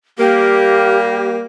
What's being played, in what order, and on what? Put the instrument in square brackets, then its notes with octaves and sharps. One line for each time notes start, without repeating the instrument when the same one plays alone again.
[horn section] G3 A#3 [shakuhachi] G4